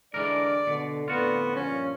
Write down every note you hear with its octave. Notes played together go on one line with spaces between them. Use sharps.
D3 E3 G#3 D4 A#4 D5
B2 D3
F2 A2 D3 B3 F4 F#4
G2 A#2 F3 C#4